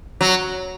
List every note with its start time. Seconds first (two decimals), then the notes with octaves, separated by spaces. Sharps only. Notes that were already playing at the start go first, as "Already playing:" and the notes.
0.21 F#3